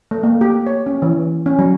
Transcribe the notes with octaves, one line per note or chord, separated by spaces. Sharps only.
A3
A#3
G4
C#5
C#4
E3
C#4
F#3